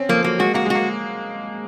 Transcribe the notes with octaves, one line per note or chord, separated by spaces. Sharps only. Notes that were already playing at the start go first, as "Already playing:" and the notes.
Already playing: C4 C#4
F3 A#3
F#3 A#3
G#3 F#4
A#3 F#4
G#3 F#4
A#3